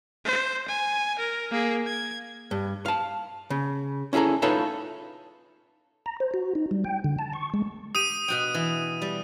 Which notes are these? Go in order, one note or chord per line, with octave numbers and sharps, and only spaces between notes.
C5
G#5
A#4
A#3 G#4
G#6
G2
F5 A5
C#3
C#4 E4 G#4 A4 A#5
D#4 F4 A4 B4 C#5 E5
A#5
C5
F#4
D#4
G3
G5
D3
A5
C#6
G#3
G4 D#6 D#7
B2 F#4 G5
E3
G3